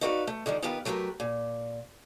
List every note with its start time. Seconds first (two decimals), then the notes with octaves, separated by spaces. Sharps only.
0.01 D#4 E4 F#4 B4 D5 F5
0.27 A3
0.46 D3 D#3 F3 G3
0.62 D#3 B3 F4 G4 B4
0.85 F#3 A3 G4 A#4 B4
1.20 A#2